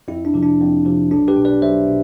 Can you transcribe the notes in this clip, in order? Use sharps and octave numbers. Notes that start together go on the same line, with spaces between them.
F2 E4
D4
C3 F3
D4
F2
C3 F3
B1 D4
G4 B4
B2
B4 D5
B1 C5 E5
B2